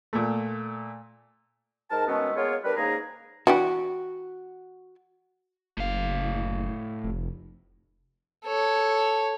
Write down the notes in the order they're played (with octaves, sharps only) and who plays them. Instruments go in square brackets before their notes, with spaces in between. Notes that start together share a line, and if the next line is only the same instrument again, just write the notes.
[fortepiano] A#2 A3
[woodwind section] G#2 A#4 A5
B2 D#3 G#3 A3 B3 C#4
G#3 A#3 B3 F4 C#5
G3 D4 A#4 B4
G#2 C#3 A#3 G#4 A#5
[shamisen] E3 D4 G4 [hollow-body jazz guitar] F#4
[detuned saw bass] F#1 [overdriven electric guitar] A2 F5
[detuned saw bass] F1
[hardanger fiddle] A4 C#5